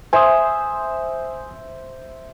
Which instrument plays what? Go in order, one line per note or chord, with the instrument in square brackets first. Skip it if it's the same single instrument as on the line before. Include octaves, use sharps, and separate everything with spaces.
[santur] C5 E5 [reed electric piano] G#5 D#6